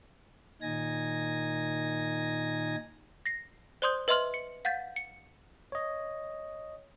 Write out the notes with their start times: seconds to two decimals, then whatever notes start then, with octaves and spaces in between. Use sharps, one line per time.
0.62 A#2 D#3 D#4 G#5 A#6
3.26 A#6 C7
3.82 C5 D5 C6 D#6 G6
4.08 B4 D#5 E5 C6 F6 F#7
4.34 C#7
4.65 F5 F#5 G6 A6 B6
4.96 C#7
5.72 C#5 D#5